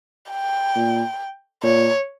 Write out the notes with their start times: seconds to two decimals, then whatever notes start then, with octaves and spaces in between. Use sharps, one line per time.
0.32 G5
0.76 A#2
1.63 A#2 C#5